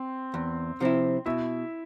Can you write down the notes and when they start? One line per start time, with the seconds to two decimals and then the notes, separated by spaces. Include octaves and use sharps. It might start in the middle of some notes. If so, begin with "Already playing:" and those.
Already playing: C4 C5
0.34 E2
0.80 C3 F3 C4 E4
1.26 B2 E4 E5